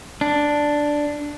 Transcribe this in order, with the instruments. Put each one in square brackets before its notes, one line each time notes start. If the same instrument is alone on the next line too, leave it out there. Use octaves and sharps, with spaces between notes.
[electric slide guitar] D4